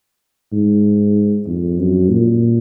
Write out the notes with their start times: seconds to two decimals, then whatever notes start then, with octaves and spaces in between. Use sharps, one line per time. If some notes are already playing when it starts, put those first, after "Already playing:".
0.53 G#2
1.47 F2
1.79 F#2
2.10 A#2